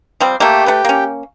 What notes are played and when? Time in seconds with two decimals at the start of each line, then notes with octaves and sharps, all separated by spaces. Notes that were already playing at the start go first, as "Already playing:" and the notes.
0.20 F3 G3 C4
0.40 A3 A#3 G4 G5
0.66 A3 B4
0.85 A#3 C#4